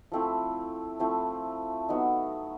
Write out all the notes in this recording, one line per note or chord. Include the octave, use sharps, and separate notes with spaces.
F3 A3 C4 E4
F3 A3 C4 E4
F#3 B3 D#4